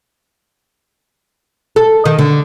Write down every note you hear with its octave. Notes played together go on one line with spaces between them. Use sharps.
A4
D#3
D3